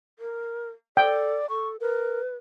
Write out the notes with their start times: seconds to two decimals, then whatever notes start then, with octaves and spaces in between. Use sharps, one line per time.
0.19 A#4
0.97 A4 D5 G5
1.49 A4 C#6
1.81 A#4 B4